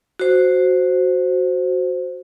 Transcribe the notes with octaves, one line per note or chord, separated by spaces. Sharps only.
F#4 C5